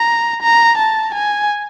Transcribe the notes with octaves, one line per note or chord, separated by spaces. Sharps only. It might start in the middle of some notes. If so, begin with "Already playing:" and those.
Already playing: A#5
A#5
A5
G#5